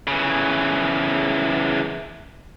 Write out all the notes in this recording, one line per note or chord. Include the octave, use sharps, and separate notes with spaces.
C#3 E3